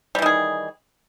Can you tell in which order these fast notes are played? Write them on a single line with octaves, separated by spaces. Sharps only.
G3 E3 D#3 G#4